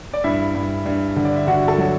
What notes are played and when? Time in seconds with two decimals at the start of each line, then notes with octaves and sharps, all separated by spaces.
0.14 D5
0.24 G2 E4 E5
0.55 G2
0.86 G2
1.16 D3
1.25 D5
1.36 E5
1.47 D3 F#4 F#5
1.68 A4 A5
1.78 F#3